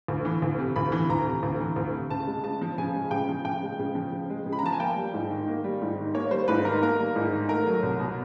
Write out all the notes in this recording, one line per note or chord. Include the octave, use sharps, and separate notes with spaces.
D2
E3
D2
C3
D2 B5
E3
D2 A#5
C3
D2
E3
D2
C3
C#3 A5
G#3
C#3 A5
F3
C#3 G#5
G#3
C#3 G5
F3
C#3 G5
G#3
C#3
F3
C#3
G#3
C#3
B5
A#5
F3 A5
G#5
A#3 G5
G3
G#2
D#3
A#3
G3
G#2
D#3
A#3 C#5
G3 C5
G#2 B4
D#3 A#4
A#3 A#4
G3
G#2
D#3
A3 A#4
F#3
C2
B2